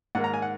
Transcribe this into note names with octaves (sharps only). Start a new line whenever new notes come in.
G#2 D#3 A#3 F#5
A#5
G#5
F#5